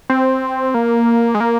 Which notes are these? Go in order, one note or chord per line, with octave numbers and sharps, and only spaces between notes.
C4
A#3
G#3
A#3